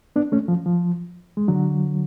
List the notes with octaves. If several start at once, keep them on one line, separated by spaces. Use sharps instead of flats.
B3 D4
A3 C#4
F3
F3
G#3
D3 F#3